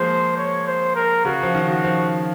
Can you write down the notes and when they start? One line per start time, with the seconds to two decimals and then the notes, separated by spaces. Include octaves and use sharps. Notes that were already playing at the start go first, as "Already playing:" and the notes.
Already playing: F3 G#3 A#3 C5
0.37 C#5
0.67 C5
0.95 A#4
1.25 C#3 F#4
1.42 F3
1.55 D#3
1.69 F#4
1.84 F3